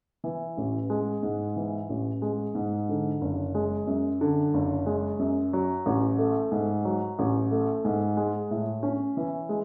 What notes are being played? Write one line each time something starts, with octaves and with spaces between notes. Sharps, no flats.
E3
A1
G#3
G#2
E3
A1
G#3
G#2
D3
F#1
G#3
F#2
D3
F#1
G#3
F#2
F#3
A1
A3
G#2
F#3
A1
A3
G#2
G#3
A2
C#4
E3
G#3